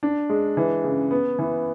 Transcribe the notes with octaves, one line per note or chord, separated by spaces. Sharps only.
D4
G#3
E3
C#3
B3
E3